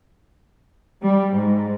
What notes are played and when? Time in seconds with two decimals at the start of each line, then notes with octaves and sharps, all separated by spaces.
1.05 G3
1.35 G#2